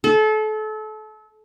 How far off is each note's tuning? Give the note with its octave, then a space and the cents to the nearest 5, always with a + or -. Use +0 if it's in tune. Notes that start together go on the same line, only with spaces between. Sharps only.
A4 -30